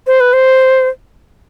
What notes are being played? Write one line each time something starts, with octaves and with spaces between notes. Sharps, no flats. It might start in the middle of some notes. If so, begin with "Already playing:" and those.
C5
B4
C5